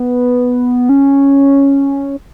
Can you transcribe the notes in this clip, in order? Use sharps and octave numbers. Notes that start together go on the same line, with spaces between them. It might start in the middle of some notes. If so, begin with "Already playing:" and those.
Already playing: B3
C#4